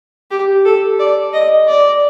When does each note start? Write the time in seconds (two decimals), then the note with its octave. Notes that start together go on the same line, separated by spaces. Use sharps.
0.31 G4
0.65 A4
0.99 D5
1.33 D#5
1.68 D5